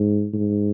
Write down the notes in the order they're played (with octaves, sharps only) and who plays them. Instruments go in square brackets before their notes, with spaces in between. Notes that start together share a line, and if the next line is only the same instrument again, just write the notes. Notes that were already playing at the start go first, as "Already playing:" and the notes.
Already playing: [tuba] G#2
G#2